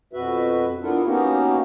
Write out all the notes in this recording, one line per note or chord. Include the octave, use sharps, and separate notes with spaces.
F2 B2 F#4 B4 E5
B3 D4 E4 F4 A4 A#4
A#3 B3 C#4 D#4 F#4 G4